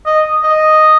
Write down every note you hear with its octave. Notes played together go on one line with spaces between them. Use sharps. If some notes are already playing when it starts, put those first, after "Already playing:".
D#5
D#5